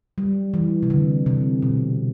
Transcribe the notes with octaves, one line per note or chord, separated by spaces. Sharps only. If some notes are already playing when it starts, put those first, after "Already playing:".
G3
E3
C3
D3
C3
B2